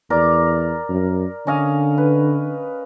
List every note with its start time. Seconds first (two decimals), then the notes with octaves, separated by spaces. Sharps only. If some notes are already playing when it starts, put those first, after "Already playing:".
0.10 E2 A#4 D5
0.90 F#2
1.47 D3 C#4 D#5 F5
1.98 B4